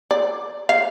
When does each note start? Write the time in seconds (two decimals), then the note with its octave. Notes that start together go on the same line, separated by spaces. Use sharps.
0.11 D5
0.69 F5